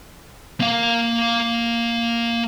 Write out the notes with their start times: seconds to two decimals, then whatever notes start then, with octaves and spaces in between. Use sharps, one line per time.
0.60 A#3 F5